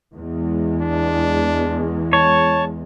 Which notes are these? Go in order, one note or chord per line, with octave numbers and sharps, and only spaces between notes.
E2 G#3
D4
C#5 A5